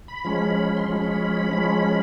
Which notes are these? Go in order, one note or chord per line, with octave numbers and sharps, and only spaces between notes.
B5
F3 G#3 C#4
C6
F3 G#3 C#4 B5
F3 G#3 C#4